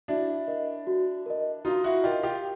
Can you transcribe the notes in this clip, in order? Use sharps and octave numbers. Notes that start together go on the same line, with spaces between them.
D4 E4 F#4
A#4 D#5
F#4
A#4 D#5
D#4 F4 F#4
E4 F#4
F4 G4 A#4 D#5
F4 G4